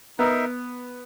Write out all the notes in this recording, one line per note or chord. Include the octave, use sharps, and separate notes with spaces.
B3 D#4 A#4 E5